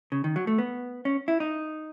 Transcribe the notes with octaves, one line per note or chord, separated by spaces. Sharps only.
C#3
D#3
F#3
A3
B3
C#4
E4
D#4